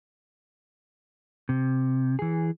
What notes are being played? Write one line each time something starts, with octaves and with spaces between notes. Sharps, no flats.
C3
E3 G#4